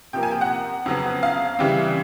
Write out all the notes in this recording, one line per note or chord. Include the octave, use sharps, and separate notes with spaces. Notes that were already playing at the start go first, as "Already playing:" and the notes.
C3 F3 A#3 G5
G#5
G5
F#5
F2 C#3 F#3 B3
F5
C#3 E3 G3 C4